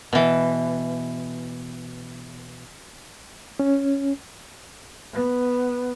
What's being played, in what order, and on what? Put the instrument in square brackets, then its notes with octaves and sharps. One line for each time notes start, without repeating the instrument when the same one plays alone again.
[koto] B2 E3
[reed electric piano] C#4
[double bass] B3